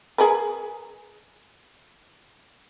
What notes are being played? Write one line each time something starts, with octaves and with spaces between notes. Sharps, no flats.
G#4 A#4 B4